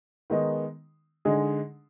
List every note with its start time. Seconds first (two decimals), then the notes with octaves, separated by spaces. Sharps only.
0.30 D#3 G#3 B3 D#4
1.25 D3 G#3 D#4 G#4